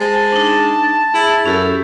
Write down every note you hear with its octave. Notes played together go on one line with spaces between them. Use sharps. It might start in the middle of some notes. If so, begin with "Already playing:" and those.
G#3 C5 A5
D4 D#4
E4 G#4 E5
F#2 C#4 E4 G4 A4